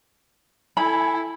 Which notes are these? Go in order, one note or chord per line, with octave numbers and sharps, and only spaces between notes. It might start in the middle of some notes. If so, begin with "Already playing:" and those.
E4 A4 G#5 B5